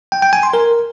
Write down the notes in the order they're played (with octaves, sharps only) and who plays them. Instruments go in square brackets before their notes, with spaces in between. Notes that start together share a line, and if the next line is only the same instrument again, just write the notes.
[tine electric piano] G5
G5
G#5
C6
A#4